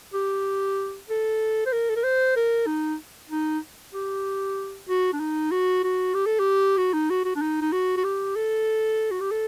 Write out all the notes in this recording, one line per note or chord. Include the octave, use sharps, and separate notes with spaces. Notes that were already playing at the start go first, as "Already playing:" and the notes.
G4
A4
C5
A#4
A4
A#4
C5
A#4
D#4
D#4
G4
F#4
D4
D#4
F#4
F#4
G4
A4
G4
F#4
D#4
F#4
F#4
D4
D#4
D#4
F#4
F#4
G4
A4
F#4
G4
A4